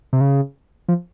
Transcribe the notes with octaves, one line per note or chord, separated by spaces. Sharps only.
C3
C#3
F3